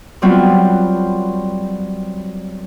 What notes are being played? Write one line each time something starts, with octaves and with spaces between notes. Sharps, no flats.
F#3 G3 B3 C4 F4 F#4